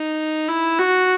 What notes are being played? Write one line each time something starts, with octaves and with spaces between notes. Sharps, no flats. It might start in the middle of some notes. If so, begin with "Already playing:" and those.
Already playing: D#4
E4
F#4